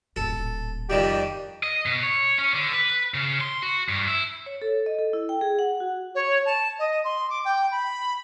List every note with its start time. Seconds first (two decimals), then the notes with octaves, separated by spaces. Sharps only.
0.16 D#1 A2 A4
0.90 F2 D#3 G3 G4
1.63 D#5
1.86 B2
2.03 C#5
2.38 C#4
2.54 D3
2.73 B4
3.14 C#3
3.41 C6
3.63 F#4
3.89 G2
4.08 E4
4.46 C#5
4.62 A4
4.86 D#5
4.99 A4
5.13 E4
5.29 G5
5.41 G#4
5.59 F#5
5.80 F#4
6.14 C#5
6.45 A5
6.79 D#5
7.04 C6
7.29 D6
7.45 G5
7.71 B5